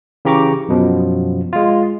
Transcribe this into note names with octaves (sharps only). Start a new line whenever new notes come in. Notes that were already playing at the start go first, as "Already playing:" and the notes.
C#3 E3 G4 A#5 C#6 D6
F#2 B2 F3
G#3 F4